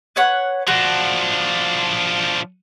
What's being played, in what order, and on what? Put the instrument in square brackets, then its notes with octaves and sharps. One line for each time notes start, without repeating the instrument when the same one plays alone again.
[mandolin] B4 C#5 F#5
[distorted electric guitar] F3 D4 [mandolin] F#4